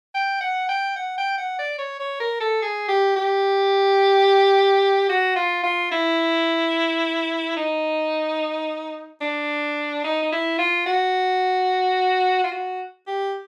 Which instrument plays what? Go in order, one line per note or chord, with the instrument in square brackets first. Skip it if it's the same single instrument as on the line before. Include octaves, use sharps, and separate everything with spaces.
[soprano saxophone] G5
F#5
G5
F#5
G5
F#5
D5
C#5
C#5
A#4
A4
G#4
G4
G4
F#4
F4
F4
E4
D#4
D4
D#4
D#4
E4
F4
F#4
F4
F#4
G4